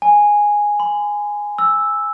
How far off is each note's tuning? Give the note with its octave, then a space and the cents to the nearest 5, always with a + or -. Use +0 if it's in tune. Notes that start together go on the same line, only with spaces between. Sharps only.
G#5 -5
B5 +45
E6 -5